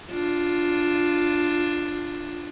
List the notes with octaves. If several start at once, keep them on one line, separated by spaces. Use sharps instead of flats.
D4 F4